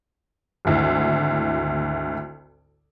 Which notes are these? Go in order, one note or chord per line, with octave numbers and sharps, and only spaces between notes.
G#1 D2 E4